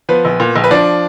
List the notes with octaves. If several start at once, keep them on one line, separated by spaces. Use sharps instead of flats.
F3 B3 B4
A#1
A#2
A#1
B4
F3 D4 D5